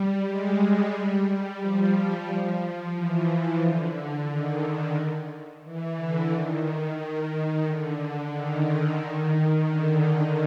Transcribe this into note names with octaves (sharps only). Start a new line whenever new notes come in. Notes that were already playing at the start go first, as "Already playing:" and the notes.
Already playing: G3
G#3
G3
F3
E3
D3
D#3
D3
E3
D3
D#3
D#3
D3
D#3
D3